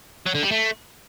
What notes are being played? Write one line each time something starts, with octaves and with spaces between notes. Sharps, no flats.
F#3
D3
G3
A3